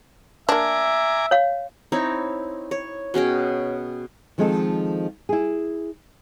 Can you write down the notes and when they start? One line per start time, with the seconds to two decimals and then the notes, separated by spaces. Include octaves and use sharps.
0.49 A#3 D4 E5 G#5 A#5 D6
1.31 C#5 F5
1.92 C4 D#4 E4 C#5
2.71 C#5
3.14 B2 C#4 G#4 G5
4.38 D#3 F3 G#3 C4 D#4 A4
5.29 E4 G#4